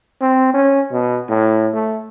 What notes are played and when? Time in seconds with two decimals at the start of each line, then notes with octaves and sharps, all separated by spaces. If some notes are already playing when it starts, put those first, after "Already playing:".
0.21 C4
0.54 C#4
0.92 B2
1.29 A2
1.74 A3